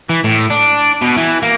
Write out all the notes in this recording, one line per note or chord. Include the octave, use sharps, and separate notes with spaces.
E3
A2
D4
B2
E3
A#3